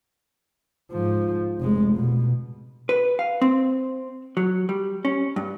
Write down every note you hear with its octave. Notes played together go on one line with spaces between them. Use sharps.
G#2 F3
F1 G#3
B2
B4
F5
C4
F#3
G3
C#4
G2